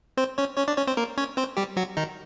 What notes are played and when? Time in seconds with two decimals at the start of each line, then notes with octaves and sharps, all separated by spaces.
0.17 C4 C5
0.38 C#4 C#5
0.57 C#4 C#5
0.68 D4 D5
0.77 C#4 C#5
0.87 C4 C5
0.97 A#3 A#4
1.18 C#4 C#5
1.37 C4 C5
1.57 G3 G4
1.77 F#3 F#4
1.97 D#3 D#4